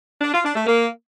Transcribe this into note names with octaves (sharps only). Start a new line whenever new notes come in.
D4
F4
D4
A3
A#3